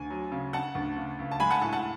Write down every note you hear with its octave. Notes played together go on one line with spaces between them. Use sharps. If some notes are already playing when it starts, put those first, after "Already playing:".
Already playing: D2 G#5
F#3
C#3
C#3 F#5 A5
D2
C#3
C#2
A5
G#3 G#5 B5
F#5 A5
A2 F#5 A5
F#5 A5